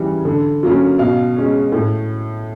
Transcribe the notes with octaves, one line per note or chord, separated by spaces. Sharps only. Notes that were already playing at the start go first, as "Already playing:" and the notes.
Already playing: C#3 E3 G3
D3
F#3 A#3 C#4
B2 F5
G#3 C#4
A2